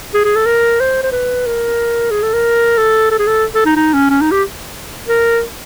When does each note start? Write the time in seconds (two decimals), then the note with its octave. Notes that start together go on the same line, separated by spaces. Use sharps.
0.14 G#4
0.25 G#4
0.36 A4
0.46 A#4
0.80 C5
1.03 C5
1.12 B4
1.46 A#4
2.11 G#4
2.22 A4
2.34 A#4
2.78 A4
3.11 A4
3.19 G#4
3.27 A4
3.55 A4
3.65 D#4
3.76 D#4
3.94 C#4
4.10 C#4
4.21 D#4
4.31 G4
5.08 A#4